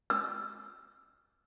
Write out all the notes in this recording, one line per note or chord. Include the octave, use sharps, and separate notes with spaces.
E6